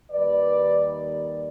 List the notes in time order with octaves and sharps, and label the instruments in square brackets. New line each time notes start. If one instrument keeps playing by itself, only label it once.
[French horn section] D#2 D#3 G3 B4 D5